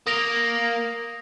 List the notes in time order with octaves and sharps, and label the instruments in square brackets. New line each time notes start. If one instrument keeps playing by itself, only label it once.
[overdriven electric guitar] A#3 [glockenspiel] D#6 A#6 F7